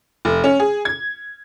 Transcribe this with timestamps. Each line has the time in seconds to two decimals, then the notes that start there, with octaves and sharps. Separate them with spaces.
0.25 F1
0.44 C#4
0.60 G#4
0.85 G#6